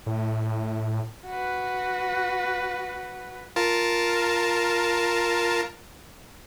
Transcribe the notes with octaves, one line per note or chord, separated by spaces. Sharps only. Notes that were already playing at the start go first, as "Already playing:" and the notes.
A2
F#4 B4
F4 A#4 A5